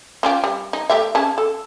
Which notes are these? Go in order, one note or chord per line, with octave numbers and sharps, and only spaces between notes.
C#4 F4 G4
G3
D#4
A3 G4 E5
C#4 G#4 A5
A4